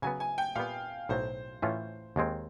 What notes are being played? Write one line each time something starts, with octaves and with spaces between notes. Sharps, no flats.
C#3 F#3 B3 G#5
G#5
G5
A#2 G3 B3 F5
B1 A2 F#3 C5
A2 E3 A3 C#4 F4
D#2 D#3 G#3 C4